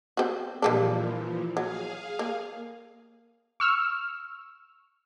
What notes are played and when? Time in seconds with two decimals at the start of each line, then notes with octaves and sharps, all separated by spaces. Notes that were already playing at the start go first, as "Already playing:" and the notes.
0.17 C4 F#4
0.62 A#2 E3 F3 G3 A#3 D4
1.57 F#3 G#4 F5
2.19 A#3
3.60 C#6 E6 F6